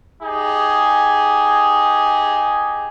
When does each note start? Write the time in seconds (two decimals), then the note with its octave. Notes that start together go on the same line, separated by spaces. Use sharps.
0.23 D#4 G4 G#4